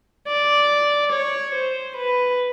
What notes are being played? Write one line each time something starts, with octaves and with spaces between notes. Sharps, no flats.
D5
C#5
C5
B4